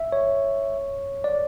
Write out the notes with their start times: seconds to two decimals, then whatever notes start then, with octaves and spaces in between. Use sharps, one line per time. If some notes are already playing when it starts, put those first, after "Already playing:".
Already playing: E5
0.12 C#5
1.24 D5